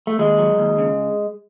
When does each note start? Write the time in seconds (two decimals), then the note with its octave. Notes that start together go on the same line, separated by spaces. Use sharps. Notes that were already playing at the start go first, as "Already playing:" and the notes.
0.07 A3
0.19 D#2 G#3
0.39 F#3
0.59 D#2
0.79 C#3